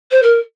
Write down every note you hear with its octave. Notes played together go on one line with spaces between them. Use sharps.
C5
A#4